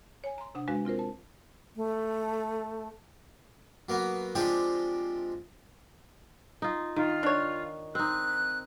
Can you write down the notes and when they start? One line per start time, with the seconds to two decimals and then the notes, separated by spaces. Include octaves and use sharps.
0.24 C#5 G#5
0.38 A#5 C6
0.55 C3 D4 F#5 D#6
0.68 G#3 D4 F#4 B4 F5
0.85 C4 F4 A#4 C5
0.99 A5
1.76 A3
3.89 F#3 A#3 B3
4.35 F3 G#3 C4 D4 G4 D#5
6.62 D#4 F4
6.96 D#3 F4
7.23 D4 C#5
7.95 C4 D#4 F#6